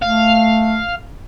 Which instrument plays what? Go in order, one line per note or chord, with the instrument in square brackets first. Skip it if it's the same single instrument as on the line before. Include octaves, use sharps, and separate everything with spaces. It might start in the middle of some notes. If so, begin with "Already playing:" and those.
[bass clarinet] A3 [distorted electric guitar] F5